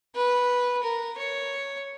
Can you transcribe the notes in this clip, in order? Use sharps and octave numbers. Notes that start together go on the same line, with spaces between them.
B4
A#4
C#5